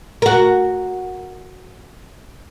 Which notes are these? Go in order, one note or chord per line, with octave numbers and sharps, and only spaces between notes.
F#4 A#4